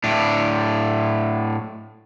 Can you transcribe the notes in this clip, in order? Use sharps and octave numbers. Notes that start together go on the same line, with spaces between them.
A2 D4